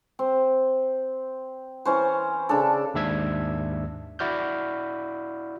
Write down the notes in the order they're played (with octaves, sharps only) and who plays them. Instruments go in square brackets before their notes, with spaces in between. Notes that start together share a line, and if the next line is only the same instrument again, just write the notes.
[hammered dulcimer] C4
E3 C#4 C5
C#3 D4 A4
[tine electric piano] D#2 G#2 D4 E5 E6 G#6
E4 F#4 D5 F6 G6